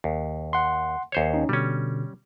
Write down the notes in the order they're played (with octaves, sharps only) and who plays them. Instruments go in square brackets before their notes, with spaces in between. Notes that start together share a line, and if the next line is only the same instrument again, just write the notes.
[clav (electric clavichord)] D#2
[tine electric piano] F#5 C6
[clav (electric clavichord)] D#2 C5 C#5
[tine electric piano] C#4 D#4
[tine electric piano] B2 D3 [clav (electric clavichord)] G3 C#4